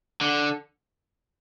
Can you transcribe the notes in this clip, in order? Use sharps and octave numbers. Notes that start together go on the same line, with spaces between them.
D3